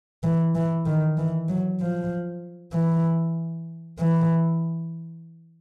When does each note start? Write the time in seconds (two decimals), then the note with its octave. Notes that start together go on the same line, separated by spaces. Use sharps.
0.23 E3
0.55 E3
0.86 D#3
1.18 E3
1.49 F#3
1.81 F3
2.73 E3
3.99 E3